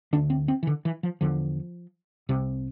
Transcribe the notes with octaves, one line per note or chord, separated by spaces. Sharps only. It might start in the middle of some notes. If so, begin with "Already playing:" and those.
D2 D3 D4
C4
C4
E3
D3
E3
F3
E2 D3 F3
C2 C3